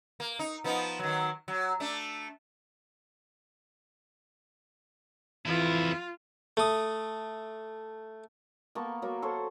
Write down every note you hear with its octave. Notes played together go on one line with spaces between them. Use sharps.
A#3
D#4
F3 B3 D#4
D#3 F#3
F#3
A3 D4
F2 E3 E4 F4
A3 D#6
A#3 B3 A5 C#6
F#3 A#3
A4 C5 C#5